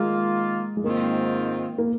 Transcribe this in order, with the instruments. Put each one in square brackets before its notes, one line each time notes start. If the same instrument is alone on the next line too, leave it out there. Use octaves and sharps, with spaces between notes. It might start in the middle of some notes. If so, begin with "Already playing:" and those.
Already playing: [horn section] D#3 A#3 F4 [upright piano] G#3
[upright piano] G#3
[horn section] G#2 D#3 C4 F4 [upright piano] A#3
[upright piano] A#3